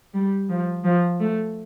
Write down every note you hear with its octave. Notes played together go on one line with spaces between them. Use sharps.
G3
F3
F3
A3